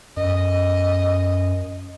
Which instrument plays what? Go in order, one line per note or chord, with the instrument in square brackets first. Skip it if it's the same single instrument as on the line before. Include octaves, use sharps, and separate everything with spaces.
[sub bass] F#2 [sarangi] D#5